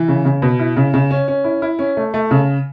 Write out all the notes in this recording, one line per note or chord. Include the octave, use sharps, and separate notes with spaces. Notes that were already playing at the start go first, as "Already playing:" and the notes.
Already playing: E3
C#3
C#3
B2
E4
C#3
C#3
C#4
C#4
E4
E4
C#4
A3
A3
C#3